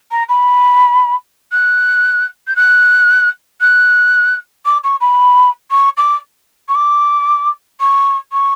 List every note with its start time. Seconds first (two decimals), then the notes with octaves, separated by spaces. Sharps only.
0.11 A#5
0.29 B5
1.52 F#6
2.47 G6
2.56 F#6
3.61 F#6
4.66 D6
4.84 C#6
5.01 B5
5.71 C#6
5.97 D6
6.69 C#6
6.75 D6
7.80 C#6
8.32 C#6